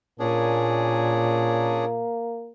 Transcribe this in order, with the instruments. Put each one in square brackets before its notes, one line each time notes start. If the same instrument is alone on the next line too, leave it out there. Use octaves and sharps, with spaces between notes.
[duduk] A#2 [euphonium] A#3 [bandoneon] C#4 D4 G#4